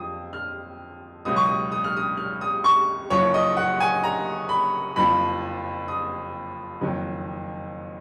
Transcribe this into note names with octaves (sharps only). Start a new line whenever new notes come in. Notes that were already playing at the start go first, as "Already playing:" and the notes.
Already playing: F2 F3 D#6
F6
C#2 B2 F#3 D#6
C#6
D#6
D#6
F6
D#6
F6
D#6
C#6
F#1 F#2 F3 C#5
D#5
F#5
G#5
A#5
B5
F#1 F2 F3 B5
D#6
F#1 F2 D#3 F#3